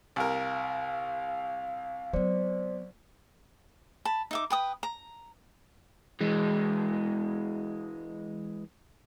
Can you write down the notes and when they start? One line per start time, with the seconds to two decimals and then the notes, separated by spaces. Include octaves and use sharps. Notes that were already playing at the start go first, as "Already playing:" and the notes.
0.16 C2 A#4 F5
2.13 F#3 B3 C5 D5
4.05 A5 B5
4.31 D#4 E5 D6
4.50 B4 G5 D#6
4.83 A#5
6.21 E3 G#3